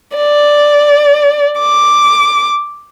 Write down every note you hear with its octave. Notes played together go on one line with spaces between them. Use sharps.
D5
D6